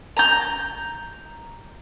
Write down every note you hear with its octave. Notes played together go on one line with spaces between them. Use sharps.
A#5 G6